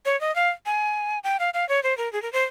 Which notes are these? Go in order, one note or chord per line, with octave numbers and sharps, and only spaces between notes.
C#5
D#5
F5
G#5
G5
F5
F5
C#5
C5
A#4
G#4
A#4
C5